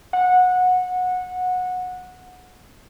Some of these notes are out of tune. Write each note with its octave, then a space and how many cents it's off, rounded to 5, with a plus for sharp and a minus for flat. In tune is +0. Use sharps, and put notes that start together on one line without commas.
F#5 -20